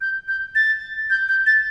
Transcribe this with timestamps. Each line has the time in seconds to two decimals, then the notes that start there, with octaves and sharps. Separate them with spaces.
0.01 G6
0.28 G6
0.55 A6
1.10 G6
1.29 G6
1.46 A6